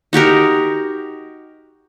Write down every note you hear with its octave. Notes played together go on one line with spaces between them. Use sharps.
D#4 F#4 G4 A#4